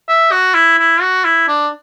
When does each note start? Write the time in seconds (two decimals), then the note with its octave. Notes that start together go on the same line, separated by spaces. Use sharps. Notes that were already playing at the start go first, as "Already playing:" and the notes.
0.08 E5
0.32 F#4
0.54 E4
0.78 E4
1.01 F#4
1.25 E4
1.48 D4